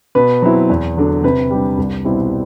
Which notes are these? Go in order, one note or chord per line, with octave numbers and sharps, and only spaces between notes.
B2 B4
F#3 C4 E4
E2
D3 F#3
C3 B4
G3 D4
C2
B2 G3 C4 E4